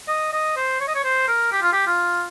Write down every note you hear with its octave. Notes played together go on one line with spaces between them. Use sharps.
D#5
D#5
C5
C#5
D#5
C#5
C5
A#4
G4
F4
G4
F4